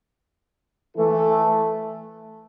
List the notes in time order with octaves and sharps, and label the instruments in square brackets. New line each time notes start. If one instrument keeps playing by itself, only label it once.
[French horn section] E3 A3 E4 A4